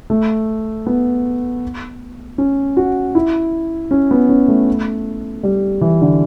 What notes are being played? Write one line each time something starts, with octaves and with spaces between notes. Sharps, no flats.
A3
B3
C#4
F#4
E4
C#4
B3
C#4
A3
G3
E3
D3